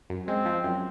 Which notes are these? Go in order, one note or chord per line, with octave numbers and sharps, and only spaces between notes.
F#2
G#3 C4
F3
F#2